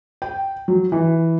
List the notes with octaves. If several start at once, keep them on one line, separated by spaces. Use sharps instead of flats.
G5
F#3
E3